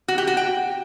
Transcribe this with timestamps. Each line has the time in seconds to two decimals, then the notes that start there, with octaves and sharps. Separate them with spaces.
0.08 F#4
0.18 G4
0.27 F#4
0.37 G5